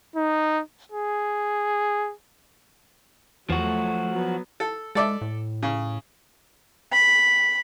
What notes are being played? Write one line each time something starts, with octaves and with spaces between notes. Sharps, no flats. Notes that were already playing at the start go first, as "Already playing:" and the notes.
D#4
G#4
E2 F3 F#3 A3 F#4
F#3 B3
A4
G#3 A4 D5 E5
A2
C#3
B5